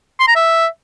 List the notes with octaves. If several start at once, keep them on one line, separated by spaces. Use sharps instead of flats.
C6
A#5
E5